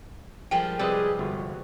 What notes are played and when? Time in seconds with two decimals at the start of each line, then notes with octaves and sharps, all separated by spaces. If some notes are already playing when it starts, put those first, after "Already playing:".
0.51 F3 G3 G#3 A#4 G5
0.79 C3 G3 G#4 B4 D#5
1.19 G1 F#4